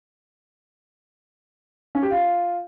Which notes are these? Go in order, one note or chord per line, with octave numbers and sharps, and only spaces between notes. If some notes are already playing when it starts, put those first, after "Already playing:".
C#4
G4
F4